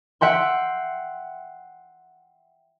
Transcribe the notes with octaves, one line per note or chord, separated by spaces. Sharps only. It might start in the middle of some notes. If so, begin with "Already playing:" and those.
E5 F#5 G5 C6